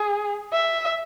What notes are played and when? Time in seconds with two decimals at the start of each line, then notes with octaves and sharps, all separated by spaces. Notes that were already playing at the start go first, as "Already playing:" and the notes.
Already playing: G#4
0.53 E5